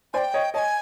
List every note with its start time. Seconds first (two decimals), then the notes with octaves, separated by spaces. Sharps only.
0.13 C5 D5 G#5
0.18 G5
0.34 C#5 D#5
0.54 C#5 D#5 A5
0.58 G#5